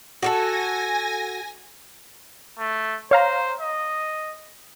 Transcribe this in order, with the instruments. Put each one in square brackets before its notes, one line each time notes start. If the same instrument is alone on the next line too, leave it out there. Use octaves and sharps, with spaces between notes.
[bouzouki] F#4 G4 A4 [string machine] G#5 A#6
[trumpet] A3
[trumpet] C5 [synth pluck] C#5 F5 A#5
[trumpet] D#5